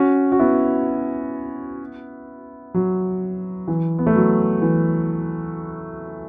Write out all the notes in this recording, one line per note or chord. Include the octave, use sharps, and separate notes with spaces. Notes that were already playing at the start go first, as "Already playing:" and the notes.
Already playing: C#4 F#4
F#4
B3 E4
F#3
E3
B3
A3
F#3
E3